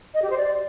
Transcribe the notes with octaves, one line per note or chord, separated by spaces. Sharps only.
D#5
G4
C5
D5